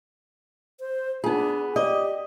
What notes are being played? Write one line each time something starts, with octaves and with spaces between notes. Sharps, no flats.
C5
B3 D4 D#4 F4 G#4
G4 D5 D#5 D6